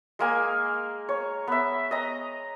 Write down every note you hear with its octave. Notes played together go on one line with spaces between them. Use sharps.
G#3 A#3 G#5
C#5
B3 E5
D#5 A#5